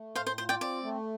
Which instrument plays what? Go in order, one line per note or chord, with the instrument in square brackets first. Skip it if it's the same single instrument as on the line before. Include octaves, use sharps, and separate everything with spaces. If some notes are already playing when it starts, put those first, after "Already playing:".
Already playing: [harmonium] A3
[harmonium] A2 [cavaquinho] C5 F5
[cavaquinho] C5
[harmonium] F4 [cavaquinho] C5
[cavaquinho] D5 G5
[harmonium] C4 [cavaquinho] D5
[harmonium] A3